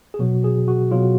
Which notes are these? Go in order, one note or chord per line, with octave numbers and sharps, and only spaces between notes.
G#4
B2 F#3 F#4
G#4
F#4
B2 F#3 F4